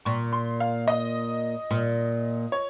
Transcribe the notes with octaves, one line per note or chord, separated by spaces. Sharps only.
A#2 C#6
C6
F5
D#5
A#2
C#5